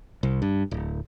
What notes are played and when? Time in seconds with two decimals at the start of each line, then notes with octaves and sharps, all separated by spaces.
0.23 C2
0.42 G2
0.71 D1